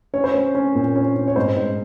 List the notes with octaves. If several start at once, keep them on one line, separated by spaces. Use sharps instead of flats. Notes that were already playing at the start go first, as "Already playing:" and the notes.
C#4 C#5
C5
C#4 C#5
C#4
A#2
C#4
C#4
C#5
G#2 C5
G#2